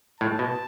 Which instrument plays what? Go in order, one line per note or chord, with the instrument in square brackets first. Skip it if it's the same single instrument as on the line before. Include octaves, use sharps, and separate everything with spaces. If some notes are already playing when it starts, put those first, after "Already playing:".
[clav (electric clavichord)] A2 [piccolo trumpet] A5
[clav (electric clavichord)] B2